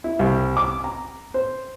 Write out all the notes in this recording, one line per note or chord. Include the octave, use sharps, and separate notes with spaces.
E4
C2
D6
A#5
C5